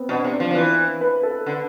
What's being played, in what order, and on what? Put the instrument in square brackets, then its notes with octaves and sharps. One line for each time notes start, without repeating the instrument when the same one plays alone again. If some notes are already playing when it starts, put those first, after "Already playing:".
Already playing: [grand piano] B3 C4
[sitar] B2 [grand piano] D4
[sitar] C3
[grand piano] D4
[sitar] F3
F3
[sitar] E3 [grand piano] E4
[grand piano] B4
A4
[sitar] D3